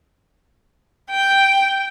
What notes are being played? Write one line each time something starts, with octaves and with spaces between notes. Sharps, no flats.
G5